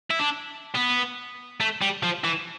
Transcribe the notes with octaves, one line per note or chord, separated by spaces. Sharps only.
E4
D4
B3
A3
G3
F3
E3